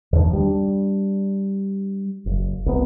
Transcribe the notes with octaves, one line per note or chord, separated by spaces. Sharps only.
E2 G2 D#3 F3
G3 D4
F#1
C2 B3